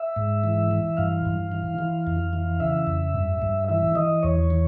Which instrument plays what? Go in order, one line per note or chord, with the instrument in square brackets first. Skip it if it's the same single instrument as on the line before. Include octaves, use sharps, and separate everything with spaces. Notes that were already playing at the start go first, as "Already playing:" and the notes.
Already playing: [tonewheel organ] E5
G#2
E3
E3
G2 F5
G2
E3
E3
F2
E3
C#3 E5
F2
G2
G2
E3 E5
E3 D#5
E2 C#5
E3